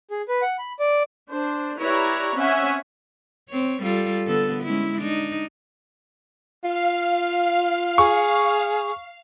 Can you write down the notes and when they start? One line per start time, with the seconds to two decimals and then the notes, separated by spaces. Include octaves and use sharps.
0.11 G#4
0.28 B4
0.42 F#5
0.59 B5
0.79 D5
1.30 D4 C5
1.79 E4 G4 B4 C#5 D5 A#5
2.36 C4 C#4 E5 F#5 G#5
3.49 C4 C#5
3.82 G3 F4 A4
4.26 D3 B3 A4
4.63 G#3 C#4 E4
4.98 D4 D#4
6.64 F4 F5
7.98 G#4 C#6